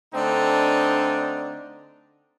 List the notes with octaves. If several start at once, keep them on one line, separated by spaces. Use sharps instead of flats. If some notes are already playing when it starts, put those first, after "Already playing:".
D3 A3 C4 D4 D#4